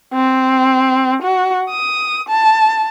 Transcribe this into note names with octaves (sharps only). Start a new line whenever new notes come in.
C4
F#4
D#6
A5